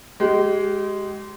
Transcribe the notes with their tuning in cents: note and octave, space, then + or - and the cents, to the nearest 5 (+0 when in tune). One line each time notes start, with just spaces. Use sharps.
G#3 +0 G4 -35